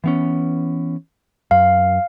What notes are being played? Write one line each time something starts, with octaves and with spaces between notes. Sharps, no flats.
E3 B3 C#4
F#2 F5